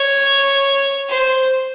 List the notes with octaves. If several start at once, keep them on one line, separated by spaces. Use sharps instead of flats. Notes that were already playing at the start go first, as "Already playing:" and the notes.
Already playing: C#5
C5